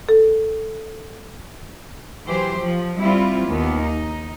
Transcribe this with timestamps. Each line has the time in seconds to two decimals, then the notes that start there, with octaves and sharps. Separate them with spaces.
0.09 A4
2.25 E3 F#3 G4 C5
2.59 F3
2.99 G3 C4 E4 F4
3.46 D#2 B3
3.81 D#4